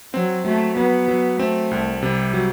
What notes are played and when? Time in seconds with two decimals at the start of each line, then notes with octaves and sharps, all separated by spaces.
0.13 F#3 C4
0.45 F#3 A3
0.77 F#3 B3
1.08 F#3
1.39 A3 C4
1.71 C2
2.02 C3 G3
2.34 F#3